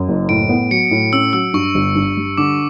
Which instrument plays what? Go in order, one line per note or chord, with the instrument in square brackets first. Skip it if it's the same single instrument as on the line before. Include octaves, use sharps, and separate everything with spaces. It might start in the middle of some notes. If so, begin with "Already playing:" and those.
Already playing: [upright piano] F#2
F#1
[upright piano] A2 [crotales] D7
[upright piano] B3
[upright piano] F#3 [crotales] C#7
[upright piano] A2
[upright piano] C#4 [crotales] E6
[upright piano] F#3 [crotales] E6
[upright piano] G2 [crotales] C#6
[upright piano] G1
G2
G3
[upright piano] D3 [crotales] D6